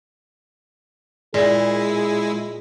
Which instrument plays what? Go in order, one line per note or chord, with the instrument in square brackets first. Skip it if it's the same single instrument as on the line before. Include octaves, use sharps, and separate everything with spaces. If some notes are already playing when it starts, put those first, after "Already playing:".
[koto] A#2 [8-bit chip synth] G#3 E4 [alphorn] G#4